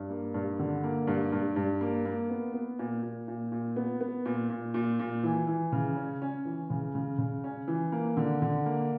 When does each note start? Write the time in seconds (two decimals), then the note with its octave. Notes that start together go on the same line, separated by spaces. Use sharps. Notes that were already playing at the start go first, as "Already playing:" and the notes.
Already playing: G2
0.10 A#3
0.34 G2
0.59 D3
0.83 A#3
1.07 G2
1.32 G2
1.56 G2
1.81 A#3
2.06 A#3
2.30 B3
2.54 B3
2.79 A#2
3.03 A#2
3.28 A#2
3.52 A#2
3.76 B3
4.01 B3
4.25 A#2
4.50 A#2
4.74 A#2
4.99 A#2
5.23 E3
5.47 E3
5.72 C#3
5.97 C#4
6.22 C#4
6.45 E3
6.70 C#3
6.95 C#3
7.18 C#3
7.44 C#4
7.68 E3
7.92 A#3
8.17 D3
8.42 D3
8.66 A#3